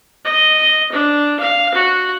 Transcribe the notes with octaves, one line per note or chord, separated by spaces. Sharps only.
D#5
D4
F5
F#4